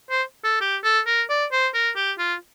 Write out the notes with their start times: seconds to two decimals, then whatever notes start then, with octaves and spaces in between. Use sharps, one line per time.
0.10 C5
0.44 A4
0.61 G4
0.84 A4
1.06 A#4
1.29 D5
1.52 C5
1.74 A#4
1.96 G4
2.18 F4